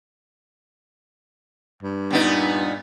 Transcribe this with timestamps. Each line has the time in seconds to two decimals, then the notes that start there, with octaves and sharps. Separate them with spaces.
1.83 G2
2.11 A#2 B3 D#4